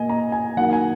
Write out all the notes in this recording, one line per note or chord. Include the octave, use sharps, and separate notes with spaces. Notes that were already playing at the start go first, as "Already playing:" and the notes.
Already playing: A#2 A#3 D#5 G#5
A#5
G#5
D#3 F#3 A#3 F#5
G#5